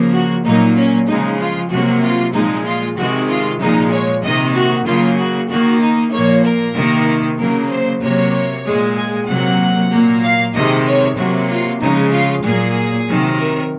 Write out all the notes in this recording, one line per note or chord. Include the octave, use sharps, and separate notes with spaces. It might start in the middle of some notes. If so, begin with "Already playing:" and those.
Already playing: C#3 F3 A#3
F#4
A#2 F#3 A#3 D#4
C#4
C#3 F3 G#3 D#4
F4
C3 F#3 A#3 F#4
F4
A#2 F3 G#3 D#4
F4
C3 D#3 G#3 F#4
F4
A#2 F3 G#3 D#4
C#5
C3 D#3 A#3 D#5
F#4
C#3 F#3 A#3 F4
F#4
D#3 A#3 F#4
D#4
A#2 F3 A#3 C#5
A#4
C3 D#3 A#3
C#3 F#3 A#3 A#4
C5
C3 F#3 A#3 C#5
A#2 G#3
G#5
C3 F#3 A#3 F#5
A#2 F#3 A#3
F5
C3 D#3 G#3 D#5
C#5
C3 F#3 A#3 F#4
F4
C#3 F3 G#3 D#4
F4
A#2 F#3 A#3 G#4
C3 D#3 F#3
A#4